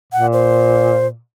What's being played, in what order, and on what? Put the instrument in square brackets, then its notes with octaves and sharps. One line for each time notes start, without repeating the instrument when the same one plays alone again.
[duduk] A#2 [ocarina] F#5
[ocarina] C5